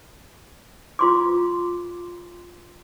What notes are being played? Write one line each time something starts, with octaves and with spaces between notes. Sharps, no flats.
F4 C6 D6